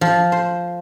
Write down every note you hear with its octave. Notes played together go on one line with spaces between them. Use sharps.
F3
C5